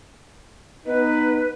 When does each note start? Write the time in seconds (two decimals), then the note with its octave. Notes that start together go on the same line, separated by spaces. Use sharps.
0.86 B3 D#4 B4